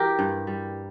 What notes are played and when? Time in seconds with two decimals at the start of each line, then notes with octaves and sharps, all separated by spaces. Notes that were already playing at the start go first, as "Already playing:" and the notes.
Already playing: E3 G4 A#4
0.19 G2
0.47 G3